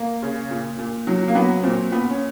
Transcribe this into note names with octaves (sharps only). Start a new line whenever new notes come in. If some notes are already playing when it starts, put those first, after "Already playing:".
Already playing: A#3
C#3
A#2
A#2
F#3
A#3
F#3 B3
A#2 C4
A#2 B3
C#4